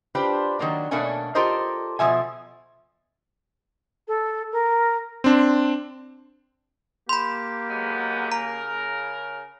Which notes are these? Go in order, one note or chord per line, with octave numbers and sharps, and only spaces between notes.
D4 F4 G4 B4 C5
D#3 F#3 A#3 D4
B2 A3 A#3 C#4 D4 G#5
F4 G4 A4 A#4 C5 D#5
B2 F3 E5 G#5
A4
A#4
C4 D4 C6
A#3 G4 B5 C6
F#3 G#3 B3
C#3 A#4 A#5